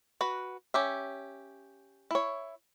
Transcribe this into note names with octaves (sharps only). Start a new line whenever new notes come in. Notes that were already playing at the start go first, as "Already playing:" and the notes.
F#4 B4
C#4 G4 E5
E4 C#5